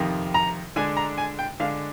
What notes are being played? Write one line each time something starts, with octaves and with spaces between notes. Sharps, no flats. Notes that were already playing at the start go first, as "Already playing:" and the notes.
Already playing: F2 C3 D#3
A#5
D3 G#3 D4 G#5
A#5
G#5
G5
D3 G#3 D4 F5